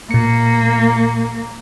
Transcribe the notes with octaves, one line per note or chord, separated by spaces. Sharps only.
A#2 A#3 C#7